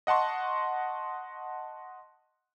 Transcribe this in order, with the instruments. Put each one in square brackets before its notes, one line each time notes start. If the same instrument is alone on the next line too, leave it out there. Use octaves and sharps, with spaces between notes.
[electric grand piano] D#5 F#5 A5 C6 C#6